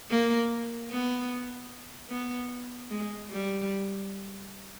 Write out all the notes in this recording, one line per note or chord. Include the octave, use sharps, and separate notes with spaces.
A#3
B3
B3
G#3
G3